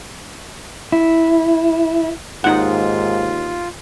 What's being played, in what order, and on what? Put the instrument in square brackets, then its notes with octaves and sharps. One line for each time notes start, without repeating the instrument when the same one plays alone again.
[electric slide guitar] E4
[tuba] D#2 [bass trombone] G#2 [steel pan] D#4 F#5 [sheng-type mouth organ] F4